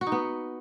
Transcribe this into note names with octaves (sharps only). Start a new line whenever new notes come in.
F#4
D#4
B3